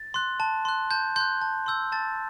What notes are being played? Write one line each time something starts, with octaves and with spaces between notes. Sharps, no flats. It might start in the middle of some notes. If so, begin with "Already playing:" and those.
Already playing: A6
C6 F#6
A5
C6 F#6
A5 G6
C6 F#6 G6
A5
C6 E6 G6
A5 A6